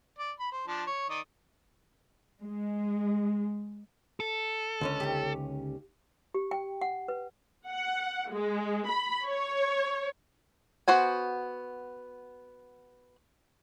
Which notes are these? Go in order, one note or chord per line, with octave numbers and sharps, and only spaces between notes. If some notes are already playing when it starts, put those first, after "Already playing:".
D5
B5
C5
F3 D4 A5
C#5
D#3 D5 D#5
G#3
A4
C#2 D3 C#4
D#2 G4
G4
G5
F#5
B4
F#5
G#3
B5
C#5
B3 F#4 C5 G#5